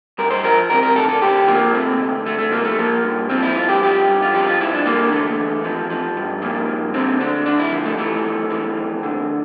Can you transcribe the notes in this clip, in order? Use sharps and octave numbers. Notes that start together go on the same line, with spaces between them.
G2 A#4
C5
F3 A#4
C3 A#4
A#4
D2 A4
A4
D2 G4
F3 A#3
C3 A3
D2
D2 A3
A3
F3 A#3
A3
F3 A#3
G2
F3 C4
E4
G2 F4
G4
F3 G4
G2
F4
F3 G4
F4
G2 E4
D4
D3 A#3
E2 A3
E2
F3
F3
G2
F3 A#3
G2
D3 C4
D2 D4
D2 D4
E4
F3
A3
E3 A3
F2
E3
F2
D3